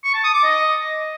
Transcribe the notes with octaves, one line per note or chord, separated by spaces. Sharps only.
C#6
A5
D#6
D6
D#5